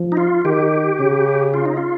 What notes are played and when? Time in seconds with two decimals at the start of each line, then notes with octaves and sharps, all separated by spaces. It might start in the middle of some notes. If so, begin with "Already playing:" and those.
Already playing: F3
0.12 D#4
0.17 F4
0.45 D#3 G4
1.00 C#3
1.54 F4
1.65 D#4
1.77 F4